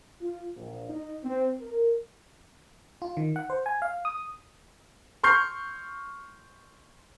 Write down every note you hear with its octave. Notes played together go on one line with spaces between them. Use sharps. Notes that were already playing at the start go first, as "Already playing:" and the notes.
F4
A#1
D#4
C4
A#4
F4
D#3
F#5
C5
G#5
F5
D#6
C6 C#6 F6 G6 C7